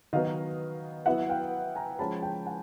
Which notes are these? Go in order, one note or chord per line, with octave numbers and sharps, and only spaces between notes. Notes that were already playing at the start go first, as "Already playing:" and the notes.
D#3 F#3 B3 D#5 F5
F#3 B3 E4 E5 F#5
F5 G5
G#5 A#5
F3 G#3 C#4 F4 A5 B5
G5 A5
F#5 G#5